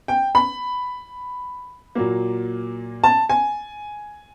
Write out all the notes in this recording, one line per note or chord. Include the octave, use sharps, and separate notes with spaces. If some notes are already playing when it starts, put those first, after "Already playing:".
G5
B5
A#2 F#3 A#3
A5
G#5